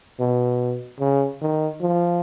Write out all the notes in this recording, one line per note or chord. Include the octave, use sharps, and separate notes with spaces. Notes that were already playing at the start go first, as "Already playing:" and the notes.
B2
C#3
D#3
F3